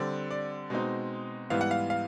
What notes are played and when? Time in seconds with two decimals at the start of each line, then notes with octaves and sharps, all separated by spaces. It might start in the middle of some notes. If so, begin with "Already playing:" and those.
Already playing: D3 G3 C4 D5
0.30 D5
0.70 B2 G#3 C4 D#4
1.50 G#2 E3 G3 B3 F5
1.61 F#5
1.71 F5
1.90 F5